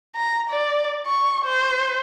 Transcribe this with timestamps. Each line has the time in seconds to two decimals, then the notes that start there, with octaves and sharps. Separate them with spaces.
0.16 A#5
0.50 D5
1.07 C#6
1.46 C5